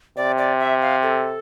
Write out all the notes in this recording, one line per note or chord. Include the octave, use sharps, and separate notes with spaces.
C3 D5
D5
E5
F5
A4